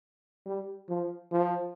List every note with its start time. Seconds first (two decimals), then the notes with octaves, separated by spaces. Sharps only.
0.46 G3
0.89 F3
1.32 F3